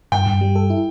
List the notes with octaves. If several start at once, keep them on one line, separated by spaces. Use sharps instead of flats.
G2 G5
G2
G3
A4
E4